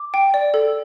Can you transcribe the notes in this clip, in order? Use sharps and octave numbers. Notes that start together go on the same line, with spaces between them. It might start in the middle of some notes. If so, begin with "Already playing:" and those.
Already playing: D6
G5
D5
A4